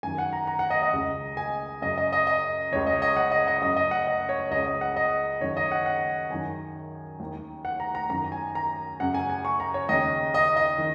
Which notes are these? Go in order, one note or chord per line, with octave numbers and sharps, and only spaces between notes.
F#2 D#3 G#5
F#5
A#5
A#5
F#5
D#5
D#5
C#2 C#3
G#5
F#2 C#3 D#5
D#5
D#5
D#5
C#2 C#3 C#5
D#5
D#5
F#5
D#5
D#5
F#2 C#3 D#5
D#5
F#5
D#5
C#5
C#2 C#3 D#5
D#5
F#5
D#5
F#2 D#3 C#5
D#5
F#5
F#5
F#2 D#3 G#5
D#2 D#3
F#5
A#5
A#5
F#2 D#3 A#5
G#5
A#5
F#2 C#3 F#5
G#5
G#5
C#6
A#5
C#5
D#2 C#3 D#5
D#5
D#5
D#3